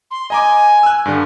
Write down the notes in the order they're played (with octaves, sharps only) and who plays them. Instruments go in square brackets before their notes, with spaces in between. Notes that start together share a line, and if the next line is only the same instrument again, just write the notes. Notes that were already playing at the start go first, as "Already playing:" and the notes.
[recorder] C6
[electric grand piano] D#5 A#5 D6 [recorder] G#5
[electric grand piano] E6 F#6
G2 D3